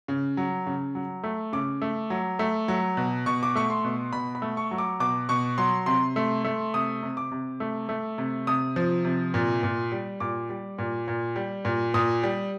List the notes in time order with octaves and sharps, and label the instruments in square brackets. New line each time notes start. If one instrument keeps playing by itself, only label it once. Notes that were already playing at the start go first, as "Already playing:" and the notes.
[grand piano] C#3
F#3
C#3
F#3
A3
C#3 D6
A3
F#3
A3
F#3
B2
B2 C#6
D6
A3 C#6
C6
B2
B2 B5
B5
A3
C#6
F#3
D6
B2 D6
B2 C#6
F#3 C6
C3 C6
A3
A3
C3 D#6
C3
D6
C3
A3
A3
C3
C3 D#6
F3
C3
A#2
A#2
G3
A#2 D6
G3
A#2
A#2
G3
A#2
A#2 D#6
G3